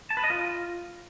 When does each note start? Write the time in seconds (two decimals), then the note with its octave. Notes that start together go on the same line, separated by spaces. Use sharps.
0.10 A5
0.17 B4
0.24 D#5
0.30 F4